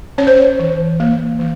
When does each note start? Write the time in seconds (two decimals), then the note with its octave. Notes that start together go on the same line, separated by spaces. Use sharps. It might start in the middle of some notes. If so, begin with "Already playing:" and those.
0.18 C#4 C#5
0.27 C5
0.37 C#5
0.59 E3
1.00 A#3
1.39 E3